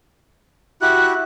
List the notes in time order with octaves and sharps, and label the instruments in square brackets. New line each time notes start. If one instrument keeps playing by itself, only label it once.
[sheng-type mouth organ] E4 F#4 G4 [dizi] F#6